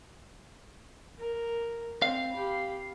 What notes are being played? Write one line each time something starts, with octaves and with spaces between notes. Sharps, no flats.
A#4
C4 F5
G4 B5